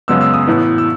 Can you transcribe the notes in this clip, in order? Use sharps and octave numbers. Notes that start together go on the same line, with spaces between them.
F#2 C#3 G#3 B3 E6
E6
D#6
A2 E3 B3
E6